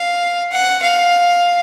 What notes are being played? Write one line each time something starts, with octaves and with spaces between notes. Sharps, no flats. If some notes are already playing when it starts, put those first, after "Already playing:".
Already playing: F5
F#5
F5